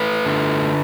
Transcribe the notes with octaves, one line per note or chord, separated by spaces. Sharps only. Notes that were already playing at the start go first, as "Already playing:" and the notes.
Already playing: A3 B4
D3